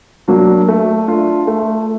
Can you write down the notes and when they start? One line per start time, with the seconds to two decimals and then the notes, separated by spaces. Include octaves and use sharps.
0.28 F#3 A#3 D4 F#4
0.68 A3
1.08 D4 F4
1.47 A3